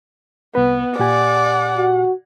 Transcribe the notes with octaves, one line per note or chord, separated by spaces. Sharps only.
C2 B3 B4
A#2 G4 D5 F#5 G#5
F#4